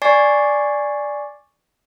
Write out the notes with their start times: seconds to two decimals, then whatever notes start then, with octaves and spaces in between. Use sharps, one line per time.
0.02 D5 G#5 C#6 D6 A6 C7